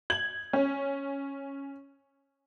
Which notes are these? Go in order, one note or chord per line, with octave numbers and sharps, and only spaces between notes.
G#6 F#7
C#4